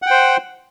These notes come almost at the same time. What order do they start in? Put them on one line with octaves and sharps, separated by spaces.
F#5 G5 C5